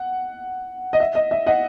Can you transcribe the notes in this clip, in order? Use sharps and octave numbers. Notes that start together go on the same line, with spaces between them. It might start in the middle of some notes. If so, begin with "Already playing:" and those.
Already playing: F#5
D#5
E5
D#5
E5
D#5 F#5